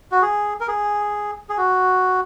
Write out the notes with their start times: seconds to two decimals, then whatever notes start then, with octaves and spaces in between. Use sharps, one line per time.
0.12 F#4
0.22 G#4
0.61 A#4
0.68 G#4
1.49 G#4
1.57 F#4